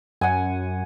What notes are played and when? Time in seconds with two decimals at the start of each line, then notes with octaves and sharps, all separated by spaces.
0.21 F#2 F#5 G#5